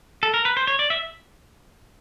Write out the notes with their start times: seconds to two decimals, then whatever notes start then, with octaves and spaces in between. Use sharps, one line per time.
0.23 A4
0.34 A#4
0.45 B4
0.57 C5
0.67 C#5
0.79 D5
0.90 E5